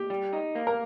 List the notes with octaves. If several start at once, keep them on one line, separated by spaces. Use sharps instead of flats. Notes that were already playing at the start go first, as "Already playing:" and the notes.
Already playing: G4
G3
D#4
A#3
A#4